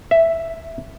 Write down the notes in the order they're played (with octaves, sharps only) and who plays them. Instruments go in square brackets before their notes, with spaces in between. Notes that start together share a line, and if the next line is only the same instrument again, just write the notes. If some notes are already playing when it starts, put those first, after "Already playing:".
[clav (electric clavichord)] E5